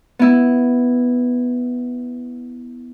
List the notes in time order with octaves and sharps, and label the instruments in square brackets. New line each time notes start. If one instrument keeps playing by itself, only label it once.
[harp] B3 E4